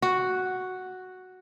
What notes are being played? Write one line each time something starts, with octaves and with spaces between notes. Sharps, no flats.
F#4